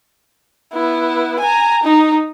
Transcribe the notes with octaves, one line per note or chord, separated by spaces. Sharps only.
B3 E4
G#5 A#5
D#4